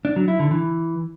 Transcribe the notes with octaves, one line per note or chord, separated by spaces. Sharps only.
D4
F#3
E4
D3
E3